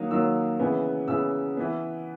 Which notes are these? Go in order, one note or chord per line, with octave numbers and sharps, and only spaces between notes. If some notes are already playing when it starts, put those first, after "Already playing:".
Already playing: D#3 F#3 A#3 D#6
D#3 F#3 A#3 E6
C#3 E3 B3
C#3 E3 B3 E6
E3 B3